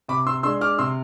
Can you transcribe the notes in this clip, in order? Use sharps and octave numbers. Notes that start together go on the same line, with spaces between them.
C3 B5 D6
C6 E6
G#3 D4 C6 E6
D6 F6
C3 C6 E6